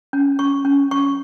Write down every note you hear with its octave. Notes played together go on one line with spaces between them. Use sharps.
C#4
C#4 C#6
C#4
C#4 C#6